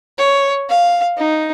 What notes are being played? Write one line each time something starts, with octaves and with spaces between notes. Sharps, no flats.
C#5
F5
D#4